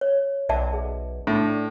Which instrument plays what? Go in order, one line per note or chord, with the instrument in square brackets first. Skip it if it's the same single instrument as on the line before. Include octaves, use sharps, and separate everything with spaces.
[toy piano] C#5
[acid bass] B1 [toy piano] D5 E5 A5
[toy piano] G#4
[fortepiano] A2 [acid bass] D4